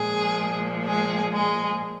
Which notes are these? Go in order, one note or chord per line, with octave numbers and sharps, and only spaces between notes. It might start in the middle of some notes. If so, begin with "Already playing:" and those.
Already playing: A#2 F3 G#3 G#4
G#3 G#4
G#3 G#4